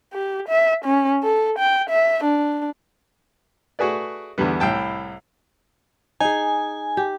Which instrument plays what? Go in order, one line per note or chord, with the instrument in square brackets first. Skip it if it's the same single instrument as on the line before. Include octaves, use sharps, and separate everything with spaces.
[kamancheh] G4
E5
C#4
A4
G5
E5
D4
[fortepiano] A3 F#4 G#4 B4 D5
E2 D3 G3 B3
C2 A2 G5 A5
[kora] D#4 G#4 [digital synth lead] G#5
[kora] G4